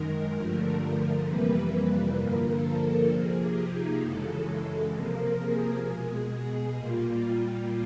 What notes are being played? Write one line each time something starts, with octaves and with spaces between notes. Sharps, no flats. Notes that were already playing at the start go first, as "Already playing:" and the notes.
Already playing: F#2 D#3 G#3 A#4
G2 D3 F3 A3
F2 C3 E3 G3 A#3 B4
G2 D3 F3 A#3 A#4
A4
C3 F3 A#3 G#4
G4
D#4
F#2 C#3 E3 G#3 A4
C3 F3 A#3 A#4
G#4
B2 G#3
A#2 G3 A#3 F4